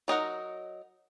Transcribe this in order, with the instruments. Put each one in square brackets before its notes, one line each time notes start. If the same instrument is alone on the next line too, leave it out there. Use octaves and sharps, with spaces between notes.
[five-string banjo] F#3 D#4 A#4 F#5